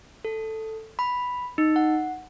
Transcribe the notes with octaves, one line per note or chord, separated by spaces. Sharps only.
A4
B5
D#4
F#5